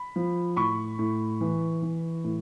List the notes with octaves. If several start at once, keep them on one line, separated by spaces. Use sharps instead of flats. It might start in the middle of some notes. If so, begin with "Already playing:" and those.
Already playing: B5
F3
A2 B5 C#6
A2
E3
E3
A2